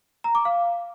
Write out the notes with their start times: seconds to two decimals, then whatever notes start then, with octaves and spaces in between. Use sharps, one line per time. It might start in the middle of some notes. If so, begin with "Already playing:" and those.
0.24 A#5
0.35 D6
0.45 F5